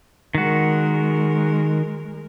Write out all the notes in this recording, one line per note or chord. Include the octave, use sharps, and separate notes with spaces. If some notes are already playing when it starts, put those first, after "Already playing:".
D#3 G#3 F#4 A#4